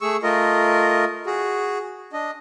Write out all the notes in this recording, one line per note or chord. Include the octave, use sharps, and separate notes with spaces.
A3 G#4 C#6 E6
A3 F4 A#4 D#5
F#4 G#4
D4 D#5